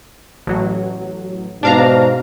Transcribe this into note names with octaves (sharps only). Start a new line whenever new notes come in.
A1 F#3
G#2 B2 D4 F5 A#5